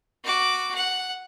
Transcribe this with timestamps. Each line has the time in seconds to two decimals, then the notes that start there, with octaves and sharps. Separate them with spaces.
0.24 F#4 D6
0.75 F#5